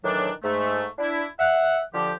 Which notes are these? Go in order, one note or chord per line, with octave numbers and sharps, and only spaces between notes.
A2 D#3 E3 F#3 D4
G#2 A3
D4 E4
E5 F#5
D3 F3 G4